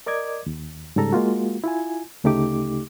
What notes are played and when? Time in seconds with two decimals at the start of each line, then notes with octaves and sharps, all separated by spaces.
0.06 A#4 D5 D#5 D6 G#6
0.46 D#2
0.96 G#2 C#3 G3 A4 A#5
1.13 G#3 A#3 F4 F#4
1.64 E4 F4 G#5
2.24 D2 C#3 A3 D#4 G4 D6